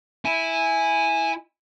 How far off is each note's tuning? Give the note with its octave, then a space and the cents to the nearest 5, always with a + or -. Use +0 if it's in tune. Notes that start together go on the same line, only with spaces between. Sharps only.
E4 -5 G#5 +0